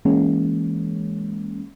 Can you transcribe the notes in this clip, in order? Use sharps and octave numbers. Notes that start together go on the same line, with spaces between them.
E3 G#3 A#3 C#4